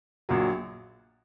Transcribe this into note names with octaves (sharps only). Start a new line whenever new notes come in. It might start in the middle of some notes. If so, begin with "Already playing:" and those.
A#1 A#2 F#3